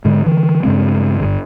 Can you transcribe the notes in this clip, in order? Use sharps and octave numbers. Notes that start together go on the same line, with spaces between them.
G#2 D3 G#3
D3 E3
G2 C#3 G#3 C4
G1 E2 G2 D3